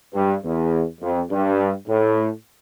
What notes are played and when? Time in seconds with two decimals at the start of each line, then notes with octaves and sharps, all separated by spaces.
0.14 G2
0.43 E2
1.01 F2
1.30 G2
1.88 A2